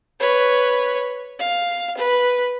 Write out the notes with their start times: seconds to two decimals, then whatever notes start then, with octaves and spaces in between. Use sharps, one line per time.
0.20 B4 C#5
1.39 F5
1.97 B4